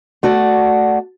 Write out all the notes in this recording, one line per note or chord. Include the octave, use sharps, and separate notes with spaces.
A3 F#4 D5